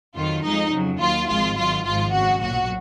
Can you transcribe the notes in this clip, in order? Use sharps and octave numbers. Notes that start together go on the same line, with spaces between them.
F2 D#3 F#3 F4
F2 F3 G#3 D#4
F2 C#3 F#3
D#2 D#3 F#3 F4
G#1 G#2 F3 G#3 F4
G#1 G#2 D#3 F#3 F4
G#1 G#2 F3 G#3 F4
F#2 C#3 G#3 F#4
B1 A#2 F#3 F#4